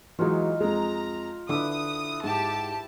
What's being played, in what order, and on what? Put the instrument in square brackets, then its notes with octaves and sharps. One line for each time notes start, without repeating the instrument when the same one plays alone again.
[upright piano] E3 F#3 G#3 [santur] D#4 F4
[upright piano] F2 G#3 [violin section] A#5
[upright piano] D3 D6 [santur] E4 B4 [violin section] D#6
[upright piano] G#2 [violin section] G4 A5